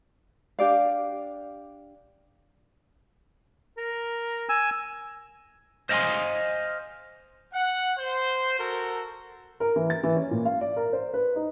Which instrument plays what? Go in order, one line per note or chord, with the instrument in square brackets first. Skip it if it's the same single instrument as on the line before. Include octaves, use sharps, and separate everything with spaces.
[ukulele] D4 G4 D5 F5
[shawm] A#4
[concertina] G#5 E6
[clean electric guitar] C5 D#5 F5 G5 G#5 C6
[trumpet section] F#5
C5
F#4 A4 A#4
[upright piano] A#4
E3
A6
E3
C#4
A#2
F5
D5
A#4
C5
B4
D#4